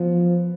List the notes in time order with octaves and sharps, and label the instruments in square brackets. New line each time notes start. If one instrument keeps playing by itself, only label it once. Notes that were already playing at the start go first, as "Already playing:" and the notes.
Already playing: [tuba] F3 [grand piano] B3